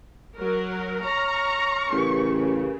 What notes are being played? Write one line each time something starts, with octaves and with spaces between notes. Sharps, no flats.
F#3 A#4
C#5 A#5 C#6 F6
A1 C#3 G4 A#4 B4